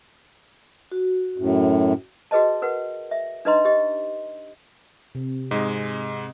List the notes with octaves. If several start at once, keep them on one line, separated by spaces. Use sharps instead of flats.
F#4
F#2 A2
F#4 G#4 B4 D#5 A5
A#4 B4 F#5 G5
E5
D4 D#4 B4 D#5 A#5 C6
G4 D#5
C3
G#2 G#3 D#5